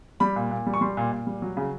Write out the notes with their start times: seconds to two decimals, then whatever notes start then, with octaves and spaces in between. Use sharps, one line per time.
0.20 G3 B5
0.36 A#2
0.51 A#2
0.66 G3
0.74 C#6
0.81 G3 C6
0.97 A#2
1.12 A#2
1.27 G3
1.42 F#3
1.57 C#3